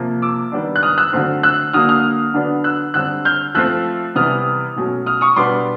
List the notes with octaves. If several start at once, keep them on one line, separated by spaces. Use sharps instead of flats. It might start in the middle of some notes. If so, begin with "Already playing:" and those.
Already playing: C3 F3 A#3
D6 E6
D#3 G3 B3 D4
F#6
D#6 F6
E6 F#6
D3 F#3 A3 C4
E6 F#6
D3 F#3 A#3 D#6 F6
D#6 F6
D3 F#3 B3 D4
E6 F#6
D3 G3 C4 E6 F#6
F6 G6
F3 A3 C4 E6 F#6
C3 E3 G3 B3 D#6 F6
B2 F#3 A3 C#4
D#6 F6
C#6 D#6
B2 G3 B3 D4 C6 D6